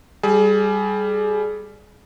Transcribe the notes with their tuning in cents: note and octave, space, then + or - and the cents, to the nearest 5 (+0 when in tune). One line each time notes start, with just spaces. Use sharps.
G3 +5 G#4 +30